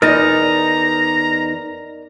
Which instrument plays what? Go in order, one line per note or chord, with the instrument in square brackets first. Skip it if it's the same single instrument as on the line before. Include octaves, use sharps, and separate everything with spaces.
[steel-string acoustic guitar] E2 D#4 [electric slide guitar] A#4 D5 D#5 [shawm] A#5